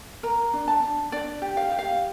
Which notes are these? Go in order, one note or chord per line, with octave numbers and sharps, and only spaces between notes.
A#4 A#5
D4
A5
D4
D4 D5
G4
F5
G4
F5